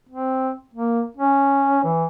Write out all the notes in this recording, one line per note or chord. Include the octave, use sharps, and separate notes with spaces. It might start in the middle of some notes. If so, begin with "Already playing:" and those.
C4
A#3
C#4
E3